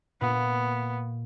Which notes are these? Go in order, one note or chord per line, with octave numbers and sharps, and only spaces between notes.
A#2 B3